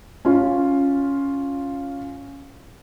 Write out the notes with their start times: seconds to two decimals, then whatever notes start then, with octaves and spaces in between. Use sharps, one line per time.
0.25 C#4 F4